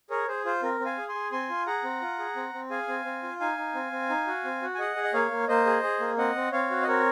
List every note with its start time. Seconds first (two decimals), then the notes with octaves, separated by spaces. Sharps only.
0.10 G#4 A#4 C#5
0.28 G#4 C5
0.45 F4 C5
0.63 C4 A#4
0.80 C4
0.85 F5 G#5
0.98 G#4
1.08 G#5 C6
1.15 G#4
1.32 C4 G#5 C6
1.49 F4
1.67 G#4 F#5 A#5
1.84 C4
2.01 F4
2.19 G#4
2.36 C4
2.54 C4
2.70 G#4 F5 G#5
2.88 C4
3.05 C4
3.23 F4
3.40 D#4 F5 G#5
3.57 D#4
3.75 C4
3.92 C4
4.10 D#4
4.27 F#4
4.44 C4
4.62 F#4
4.75 G#5
4.79 G#4 D#5 F#5
4.96 G#4
5.04 D#5
5.14 A#3 C#5 F5
5.31 A#3
5.48 A#3 C5 D#5
5.66 G#4
5.83 G#4
6.00 A#3
6.18 C4 D#5 F#5
6.35 C4
6.52 C4 C#5 F5
6.70 F#4
6.83 D#5
6.87 C4 A#4 C#5